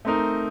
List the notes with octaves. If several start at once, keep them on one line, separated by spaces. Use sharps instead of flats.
A3 C4 D#4 A#4